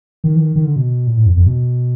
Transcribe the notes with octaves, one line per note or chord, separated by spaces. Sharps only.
D#3
E3
D#3
D#3
D3
B2
A#2
A2
F2
F2
B2